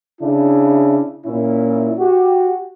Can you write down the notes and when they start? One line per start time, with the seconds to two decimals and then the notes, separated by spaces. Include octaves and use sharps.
0.22 C#3 D4 E4
1.26 A#2 C#4 E4
1.99 F#4 G4